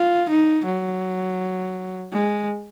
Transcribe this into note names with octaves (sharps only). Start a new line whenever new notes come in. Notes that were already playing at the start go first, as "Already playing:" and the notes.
Already playing: F4
D#4
F#3
G#3